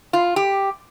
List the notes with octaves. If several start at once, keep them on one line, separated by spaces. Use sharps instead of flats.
F4
G4